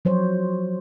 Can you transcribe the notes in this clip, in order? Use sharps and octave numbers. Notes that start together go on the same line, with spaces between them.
F3 F#3 C5 C#5